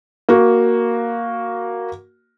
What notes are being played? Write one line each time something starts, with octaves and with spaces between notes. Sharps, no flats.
A#3 F#4